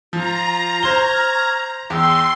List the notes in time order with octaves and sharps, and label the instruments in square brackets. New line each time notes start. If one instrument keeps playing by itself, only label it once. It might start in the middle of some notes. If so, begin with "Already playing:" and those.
[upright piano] F3 [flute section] F4 [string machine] A#5
[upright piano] C5 C6 G7 [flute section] C#6 F6 G#6
[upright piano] E2 [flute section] G5 E6 [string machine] C6